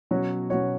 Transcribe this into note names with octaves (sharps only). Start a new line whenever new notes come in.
B2 F#3 C#4 F#4 C#5
B2 F#3 C#4 F#4 C#5